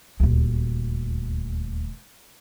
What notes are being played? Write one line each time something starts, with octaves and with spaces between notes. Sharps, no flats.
D#1 D2